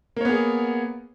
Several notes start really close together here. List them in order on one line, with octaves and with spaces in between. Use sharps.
A#3 C#5 B3 G#4